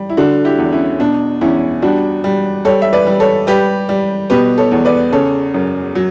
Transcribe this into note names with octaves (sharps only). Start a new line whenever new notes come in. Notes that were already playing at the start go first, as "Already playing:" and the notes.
Already playing: G3
E4
D3 D4 F#4
E4 G4
E2
C#4 E4
B2 D4
E2 C#4 E4
G3 D4 F#4
G3
G3 A4 C#5
E5
B4 D5
G3
A4 C#5
G3 G4 B4
G3
B2 G4 B4
A4 C#5
E2
B4 D5
C#3 A4 C#5
F#2
F#3